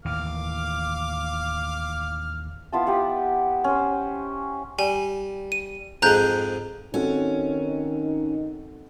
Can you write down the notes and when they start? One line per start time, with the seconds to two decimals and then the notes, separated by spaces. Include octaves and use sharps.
0.05 D#2 A2 E3 F5 D6 F6
2.72 B3 E4 F4 A5
2.87 G4 B4 F#5
3.64 C#4 C5
4.79 G3 G#5
5.52 D#7
6.02 F2 G#2 G#3 A#5 F#6 G6
6.94 D#3 C4 C#4 D#4 F#4 A4